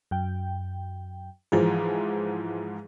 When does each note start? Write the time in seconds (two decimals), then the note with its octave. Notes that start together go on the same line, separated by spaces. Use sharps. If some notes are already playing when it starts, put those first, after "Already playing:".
0.11 F#2 G5
1.52 G#2 E3 F3 G#4